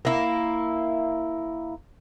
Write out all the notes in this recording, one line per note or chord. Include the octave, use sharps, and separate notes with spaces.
A#3 E4